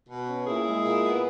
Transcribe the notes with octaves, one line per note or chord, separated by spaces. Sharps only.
B2
C#4
A#2 E4 G#4
G#3
A#2
B3